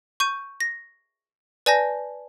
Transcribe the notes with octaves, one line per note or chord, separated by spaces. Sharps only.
C#6 G6 D#7
A#6
B4 D5 G#5 A5 G6 A#6